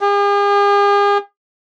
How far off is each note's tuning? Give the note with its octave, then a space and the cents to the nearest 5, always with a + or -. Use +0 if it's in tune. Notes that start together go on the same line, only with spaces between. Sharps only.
G#4 -45